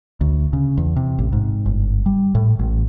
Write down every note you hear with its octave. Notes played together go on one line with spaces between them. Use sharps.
D2
C#3
E2
C3
A1
G#2
G1
G3
A2
A1